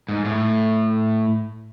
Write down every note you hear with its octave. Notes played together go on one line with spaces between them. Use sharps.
G#2
A2